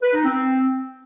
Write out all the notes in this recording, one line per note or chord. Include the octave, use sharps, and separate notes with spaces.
B4
D#4
C4